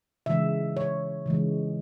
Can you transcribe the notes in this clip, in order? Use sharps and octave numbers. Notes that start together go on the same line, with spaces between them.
C#3 E3 G#3 E5
C#5
C#3 E3 G#3